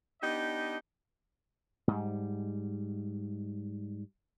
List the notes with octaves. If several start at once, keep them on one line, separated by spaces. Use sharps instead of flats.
B3 D4 D#4 G4 D#5
G#2 G3